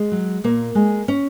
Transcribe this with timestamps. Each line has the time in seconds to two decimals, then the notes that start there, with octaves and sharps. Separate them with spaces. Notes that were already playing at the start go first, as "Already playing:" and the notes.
Already playing: G#3
0.12 F#3
0.44 A#2 A#3
0.75 G#3
1.08 C#4